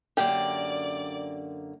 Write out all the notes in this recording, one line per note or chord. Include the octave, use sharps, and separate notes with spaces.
F#2 D3 A#3 G4 D5